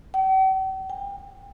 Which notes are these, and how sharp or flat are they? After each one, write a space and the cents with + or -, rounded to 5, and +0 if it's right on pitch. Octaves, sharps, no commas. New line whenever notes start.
G5 -45
G5 +35